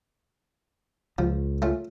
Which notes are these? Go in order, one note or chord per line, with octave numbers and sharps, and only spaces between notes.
C#2 F3
A3 C#4 F4